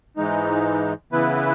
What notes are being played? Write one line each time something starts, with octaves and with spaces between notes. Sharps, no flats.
G#2 E3 G#3 D#4
C#3 E3 B3 E4 B4